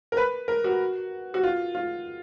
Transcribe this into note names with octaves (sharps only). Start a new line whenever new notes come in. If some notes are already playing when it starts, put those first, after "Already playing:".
A#4
B4
A#4
F#4
F#4
F4
F4